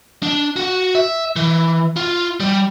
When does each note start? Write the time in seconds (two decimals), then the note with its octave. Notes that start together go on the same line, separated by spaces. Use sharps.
0.23 D4
0.56 F#4
0.95 E5
1.36 E3
1.96 F4
2.40 G3